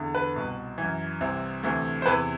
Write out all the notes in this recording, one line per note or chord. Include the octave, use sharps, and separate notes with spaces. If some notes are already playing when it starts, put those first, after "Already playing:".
Already playing: E2 D3
B4
C2 B2
E3
F#2
C2 C3 E3
D2 C3 E3
C5
E2 C3 E3 B4